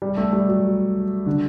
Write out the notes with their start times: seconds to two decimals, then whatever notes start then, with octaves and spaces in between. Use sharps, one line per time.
0.02 G3
0.17 A3
0.33 G3
0.49 F#3
1.26 D3